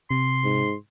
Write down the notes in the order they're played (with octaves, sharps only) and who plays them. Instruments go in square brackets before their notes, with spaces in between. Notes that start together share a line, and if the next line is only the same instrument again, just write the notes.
[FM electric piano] C3 [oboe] C6
[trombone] G#2